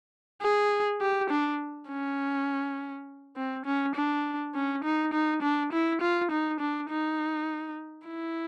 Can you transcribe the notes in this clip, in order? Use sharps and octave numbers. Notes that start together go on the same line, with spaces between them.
G#4
G4
D4
C#4
C4
C#4
D4
C#4
D#4
D#4
D4
E4
F4
D#4
D4
D#4
E4